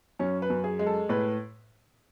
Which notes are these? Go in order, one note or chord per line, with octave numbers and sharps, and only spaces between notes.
F#2 C#4
B4
F#2
G#4
G#3
A4
A2 B4